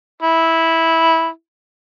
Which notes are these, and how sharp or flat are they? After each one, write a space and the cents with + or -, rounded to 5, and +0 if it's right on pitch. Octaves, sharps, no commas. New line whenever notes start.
E4 -10